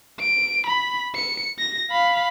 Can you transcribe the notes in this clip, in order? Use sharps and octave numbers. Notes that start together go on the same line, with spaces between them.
D7
B5
C#7
A#6
F5 B5